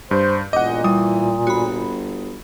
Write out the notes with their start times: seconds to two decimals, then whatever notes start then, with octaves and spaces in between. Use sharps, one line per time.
0.11 G2 C5 G6
0.53 E1 A#2 D#5 F#5 D6
0.84 E3 G3 D#6
1.47 G1 F#4 B5